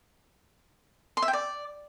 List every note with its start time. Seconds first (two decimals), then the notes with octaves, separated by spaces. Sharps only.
1.17 C6
1.22 E5
1.28 G5
1.33 D5